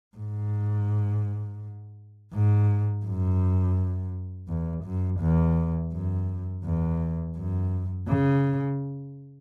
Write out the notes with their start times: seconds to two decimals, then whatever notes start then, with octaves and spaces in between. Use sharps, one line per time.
0.17 G#2
2.33 G#2
3.05 F#2
4.48 E2
4.85 F#2
5.21 E2
5.93 F#2
6.65 E2
7.36 F#2
8.08 C#3